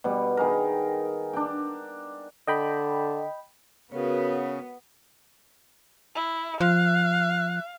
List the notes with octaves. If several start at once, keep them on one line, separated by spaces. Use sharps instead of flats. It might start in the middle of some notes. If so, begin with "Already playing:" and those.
B2 G3
D#3 G#4 A#4
D4 G5
D3 D#5 G5 B5
C#3 B3 F#4 A#4 C#5
E4
F3 F5 F#6